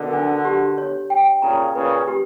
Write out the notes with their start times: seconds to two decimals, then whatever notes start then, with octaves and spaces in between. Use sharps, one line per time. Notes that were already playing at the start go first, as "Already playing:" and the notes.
Already playing: B2 D3 A#4
0.13 D4
0.45 G4
0.78 C#5
1.10 G5
1.42 A#2 C#3 A#5
1.74 A#2 C#3 B4
2.08 G4